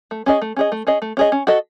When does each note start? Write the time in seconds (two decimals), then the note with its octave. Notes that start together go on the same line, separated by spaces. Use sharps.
0.11 A3
0.26 C#4 G#4 D#5
0.42 A3
0.57 C#4 G#4 D#5
0.72 A3
0.87 C#4 G#4 D#5
1.02 A3
1.17 C#4 G#4 D#5
1.32 C#4
1.47 F#4 A4 D#5